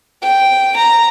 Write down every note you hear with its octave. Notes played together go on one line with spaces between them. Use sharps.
G5
A#5